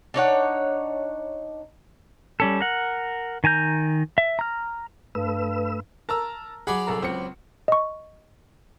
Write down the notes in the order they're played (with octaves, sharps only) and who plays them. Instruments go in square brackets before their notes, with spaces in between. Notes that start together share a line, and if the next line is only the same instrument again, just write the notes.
[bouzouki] D4 D#4 C#5 F#5
[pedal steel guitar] G3 C#4 A4
A#4 F#5
D#3 G#5 A#5 G6
E5
A#5 F6
[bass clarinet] G2 [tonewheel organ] A3 B4 E6
[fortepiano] A#4 [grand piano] A5 A#5 E6
[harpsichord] F#3 D5 B5 [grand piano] G#4 F#5
[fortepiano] C2 A4 A#5
[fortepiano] C#2 [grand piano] C4 C#7
[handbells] D#5 C#6